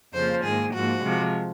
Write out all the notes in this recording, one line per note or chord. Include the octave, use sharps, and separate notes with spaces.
F2 C#3 F3 A#3 C5
G#2 D#3 A#3 G#4
G#2 F3 A#3 F#4
C3 F3 G#3